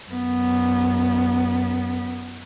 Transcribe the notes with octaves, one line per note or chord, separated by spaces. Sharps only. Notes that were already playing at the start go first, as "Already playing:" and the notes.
F#2 B3